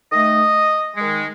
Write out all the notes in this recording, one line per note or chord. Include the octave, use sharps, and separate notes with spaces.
D#3 A3 D#5
D#3 G#3